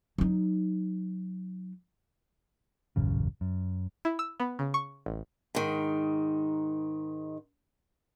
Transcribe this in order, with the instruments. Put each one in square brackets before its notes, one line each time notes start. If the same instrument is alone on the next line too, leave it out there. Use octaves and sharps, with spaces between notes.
[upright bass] F#3 D#4
[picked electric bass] D#1 A1 F#2 C#3
F#2
[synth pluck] E4
E6
B3
C#3
C#6
A1
[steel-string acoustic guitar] G#2 D#3